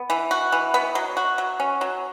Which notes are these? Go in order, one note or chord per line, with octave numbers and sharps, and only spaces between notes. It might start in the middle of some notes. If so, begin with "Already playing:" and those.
Already playing: B3
E3
F#4
E3
B3
F#3
F#4
F#3
C#4
F#3